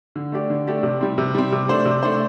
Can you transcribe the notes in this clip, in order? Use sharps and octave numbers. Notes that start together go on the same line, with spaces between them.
D3
A3 D4 G4 D5
D3
A3 D4 G4 D5
C3
G3 C4
C3
G3 C4
C3
A3 D4 C5
C3
A3 D4 C5